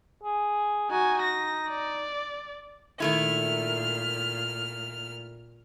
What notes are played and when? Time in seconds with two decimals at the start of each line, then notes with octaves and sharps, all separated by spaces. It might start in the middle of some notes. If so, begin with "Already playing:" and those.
0.23 G#4
0.90 D#4 F#4 G#5
1.22 A#6
1.69 D5
3.00 A#2 D#3 A3 E4 F6